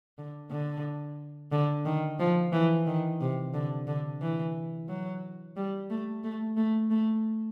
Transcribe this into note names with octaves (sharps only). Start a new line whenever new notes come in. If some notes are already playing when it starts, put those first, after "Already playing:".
D3
D3
D3
D#3
F3
E3
D#3
C3
D3
D3
E3
F#3
G3
A3
A3
A3
A3